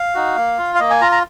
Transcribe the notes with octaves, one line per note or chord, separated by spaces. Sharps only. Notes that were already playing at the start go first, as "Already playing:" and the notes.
Already playing: F5
D#4 F#4
A#3
F4
F5
A#3 D#5
G#5
F4 A#5
A#5